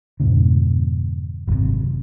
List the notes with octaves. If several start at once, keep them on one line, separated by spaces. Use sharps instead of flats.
F2 G#2 B2 D3
G#1 F#2 A2 C3